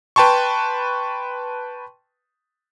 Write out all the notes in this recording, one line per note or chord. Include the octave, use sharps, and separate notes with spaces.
B4 G5 A5 C6 C#6